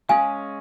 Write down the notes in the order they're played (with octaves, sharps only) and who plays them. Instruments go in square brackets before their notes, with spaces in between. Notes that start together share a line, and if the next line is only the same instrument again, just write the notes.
[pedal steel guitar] G#3 C#4 G#4 [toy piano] F5 G#5